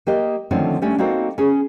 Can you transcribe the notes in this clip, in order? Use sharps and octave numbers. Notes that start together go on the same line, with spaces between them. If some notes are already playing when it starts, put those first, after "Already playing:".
A#3 G4 D#5
D3 D#3 F3 A3 C4 C#4
G3 A3 C#4 D4
A#3 C4 D#4 F#4 A4
C#4 G#4